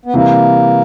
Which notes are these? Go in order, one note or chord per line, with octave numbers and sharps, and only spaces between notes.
B3
C3 E3 G3 A#3